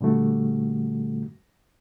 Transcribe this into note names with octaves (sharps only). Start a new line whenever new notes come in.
A#2 D3 G3 A3 F#4